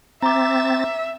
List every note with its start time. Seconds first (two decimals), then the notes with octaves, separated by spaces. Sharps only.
0.22 C4 E5 A#5 D6 A6